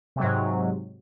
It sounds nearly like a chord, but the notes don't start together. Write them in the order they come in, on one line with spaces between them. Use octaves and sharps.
C3 F#3 G#2